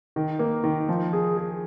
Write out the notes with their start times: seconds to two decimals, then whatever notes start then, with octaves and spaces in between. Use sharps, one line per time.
0.16 D#3
0.39 A#3
0.64 D#3
0.89 F3
1.13 G#4
1.37 G#4